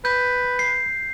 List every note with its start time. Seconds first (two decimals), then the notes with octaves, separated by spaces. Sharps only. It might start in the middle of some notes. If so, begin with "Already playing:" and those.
0.05 B4 G6
0.59 C7